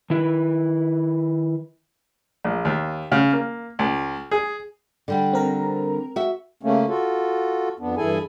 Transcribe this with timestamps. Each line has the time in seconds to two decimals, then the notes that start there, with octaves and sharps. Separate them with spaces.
0.10 D#3 E4 B4
2.45 A#1
2.65 D#2
3.12 C#3
3.33 A#3
3.79 C#2
4.31 G#4
5.08 D3 G3 F#5
5.33 C4 A#4 A#5
6.16 F#4 E5
6.63 C#3 A3 A#3 C#4
6.88 F4 F#4 A4
7.79 F2 B3 D4
7.97 G2 E3 E4 G#4 A4 G#5